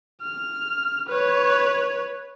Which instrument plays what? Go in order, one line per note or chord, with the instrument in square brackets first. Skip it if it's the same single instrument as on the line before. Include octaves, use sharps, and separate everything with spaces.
[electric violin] F6
B4 C#5